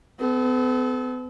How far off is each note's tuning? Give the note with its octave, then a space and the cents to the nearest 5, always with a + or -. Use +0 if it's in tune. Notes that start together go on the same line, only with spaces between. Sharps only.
B3 +40 A4 -30